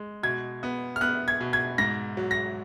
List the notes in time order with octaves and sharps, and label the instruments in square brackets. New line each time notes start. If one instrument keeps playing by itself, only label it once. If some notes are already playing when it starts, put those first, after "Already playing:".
Already playing: [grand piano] G#3
B2 G#6
B3
F6
B3 F#6
G#6
B2
G#6
G#2 A#6
F#3
A#6